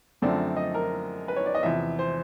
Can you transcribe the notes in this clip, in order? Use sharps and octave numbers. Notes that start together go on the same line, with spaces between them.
F#2 D3 F3 A3 C4 D5
D#5
A#4
B4
C#5
D5
D#5
E2 C3 F3 E5
C5